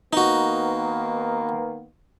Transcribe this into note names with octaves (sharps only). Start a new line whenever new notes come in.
D#3 A#3 B3 D#4 F#4